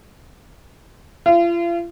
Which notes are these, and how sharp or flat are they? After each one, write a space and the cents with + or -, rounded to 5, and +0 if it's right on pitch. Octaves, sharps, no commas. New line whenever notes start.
F4 -40